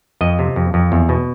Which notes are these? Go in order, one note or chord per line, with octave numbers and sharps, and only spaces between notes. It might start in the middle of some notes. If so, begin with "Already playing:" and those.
F2 D#5
C3
F2
F2
E2
B2